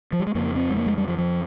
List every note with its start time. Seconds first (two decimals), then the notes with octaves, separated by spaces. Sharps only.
0.13 F3
0.20 G3
0.27 G#3
0.35 F2 C#3 A#3
0.56 C4
0.70 G#3
0.77 A#3
0.86 G#3
0.98 G3
1.08 F3
1.18 F3